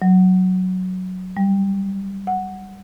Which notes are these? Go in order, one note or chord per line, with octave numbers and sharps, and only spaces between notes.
F#3
G3
F#5